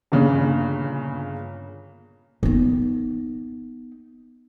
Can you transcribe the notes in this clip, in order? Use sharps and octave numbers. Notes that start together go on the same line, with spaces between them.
G1 A#2 C#3
B3 D#4